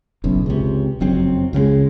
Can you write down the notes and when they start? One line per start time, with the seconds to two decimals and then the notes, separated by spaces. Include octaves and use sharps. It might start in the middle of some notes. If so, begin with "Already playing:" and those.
0.24 F#1 B1 F#2
0.46 C#2 C3
1.00 F#1 F2 F#3 C4
1.53 C#2 C#3 F#3 G#3